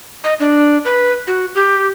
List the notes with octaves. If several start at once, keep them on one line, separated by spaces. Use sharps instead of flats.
D#5
D4
B4
F#4
G4